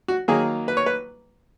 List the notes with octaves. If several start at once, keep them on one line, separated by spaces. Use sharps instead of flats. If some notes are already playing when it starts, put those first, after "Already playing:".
F#4
D#3 F#3 A#3 G#4
B4
C#5
B4